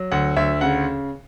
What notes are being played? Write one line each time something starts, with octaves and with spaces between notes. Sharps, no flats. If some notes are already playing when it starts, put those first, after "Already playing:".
Already playing: F#3
D2 F#5
D2 E5
C#3 F#5